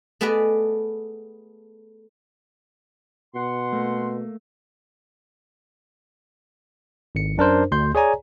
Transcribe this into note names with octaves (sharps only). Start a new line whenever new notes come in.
A3 B3 G#4 B4 D5 D#5
B2 F#5 C6
A3 A#3
G#1 C#7
F#2 D4 A#4 C5
D2 C6 G6
G#4 C#5 D5 G#5 A#5